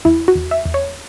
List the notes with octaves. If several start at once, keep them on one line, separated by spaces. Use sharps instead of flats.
E2 E4
F#4
E2
E5
E2
C#5